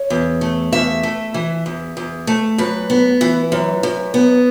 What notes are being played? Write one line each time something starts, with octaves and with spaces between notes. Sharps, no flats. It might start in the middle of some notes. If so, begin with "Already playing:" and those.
Already playing: C#5
E2
A3
E2 E5
A3
E3
E2
E2
A3
F#2 B4
B3
E3
F#2
F#2
B3